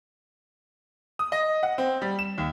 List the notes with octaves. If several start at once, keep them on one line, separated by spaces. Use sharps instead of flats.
D#6
D#5
F#5
C4
G3
E7
D#2